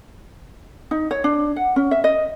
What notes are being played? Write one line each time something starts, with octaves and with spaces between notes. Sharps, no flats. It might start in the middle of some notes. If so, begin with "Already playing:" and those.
D#4
C#5
D4
F#5
C#4
E5
D#5